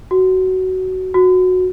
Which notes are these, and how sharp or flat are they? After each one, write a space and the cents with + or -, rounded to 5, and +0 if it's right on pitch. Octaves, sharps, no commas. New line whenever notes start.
F#4 +15
F#4 -10